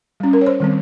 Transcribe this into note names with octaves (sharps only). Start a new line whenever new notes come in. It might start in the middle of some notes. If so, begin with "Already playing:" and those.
G3 C#4
A#4
C#5
C5
D#3 G3 C4